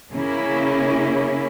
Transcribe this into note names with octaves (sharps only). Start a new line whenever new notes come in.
C#3 A#3 C#4 E4